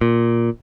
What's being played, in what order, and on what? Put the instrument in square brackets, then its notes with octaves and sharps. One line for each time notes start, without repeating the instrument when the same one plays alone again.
[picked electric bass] A#2